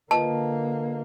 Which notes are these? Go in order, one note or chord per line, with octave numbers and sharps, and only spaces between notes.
D3 A#3 F4 B4 D#5 A5